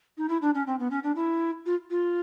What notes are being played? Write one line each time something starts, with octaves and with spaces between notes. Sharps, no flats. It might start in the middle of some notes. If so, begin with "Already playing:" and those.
D#4
E4
D4
C#4
C4
B3
C#4
D4
E4
F4
F4